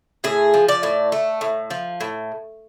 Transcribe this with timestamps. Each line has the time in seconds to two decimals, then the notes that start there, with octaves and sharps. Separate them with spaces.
0.24 A2 G#4
0.54 F3
0.69 D5
0.83 A2
1.12 A3
1.41 A2
1.70 F3
2.01 A2